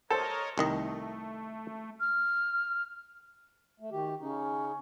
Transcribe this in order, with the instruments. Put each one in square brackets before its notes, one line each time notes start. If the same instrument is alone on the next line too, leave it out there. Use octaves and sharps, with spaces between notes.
[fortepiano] A4 C5 [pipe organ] A#4 C#5 D#5
[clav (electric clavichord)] C2 D#3 D#5 [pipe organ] A3
[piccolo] F6
[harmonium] A3
[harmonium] D#3 G4 [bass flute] F#4
[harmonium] C#3 D#4 [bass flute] C#4